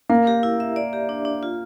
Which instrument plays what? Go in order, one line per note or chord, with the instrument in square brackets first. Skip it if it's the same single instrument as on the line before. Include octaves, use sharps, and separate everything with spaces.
[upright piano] A#3 [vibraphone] A#4
[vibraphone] G4
E4
E5
D5
G4
D4
D4
F4